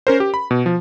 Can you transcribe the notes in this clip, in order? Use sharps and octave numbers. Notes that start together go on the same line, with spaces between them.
C#4 A#4 C5
G4
B5
B2
F3